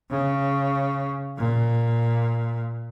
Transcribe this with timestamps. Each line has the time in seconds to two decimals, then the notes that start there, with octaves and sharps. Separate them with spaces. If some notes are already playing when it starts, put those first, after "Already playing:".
0.11 C#3
1.38 A#2